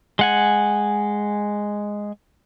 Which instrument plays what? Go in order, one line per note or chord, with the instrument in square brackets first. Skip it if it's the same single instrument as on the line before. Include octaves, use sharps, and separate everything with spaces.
[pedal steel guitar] G#3 F#5 G#5